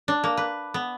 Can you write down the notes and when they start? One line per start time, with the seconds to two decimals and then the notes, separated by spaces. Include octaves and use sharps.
0.08 D4
0.24 A#3
0.37 B4
0.74 B3